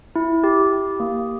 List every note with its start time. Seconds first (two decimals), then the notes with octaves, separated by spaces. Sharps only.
0.16 E4
0.44 G4
0.73 G4
1.00 A#3